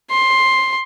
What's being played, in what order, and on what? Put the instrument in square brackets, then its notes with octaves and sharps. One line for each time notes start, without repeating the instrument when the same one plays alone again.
[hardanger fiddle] C6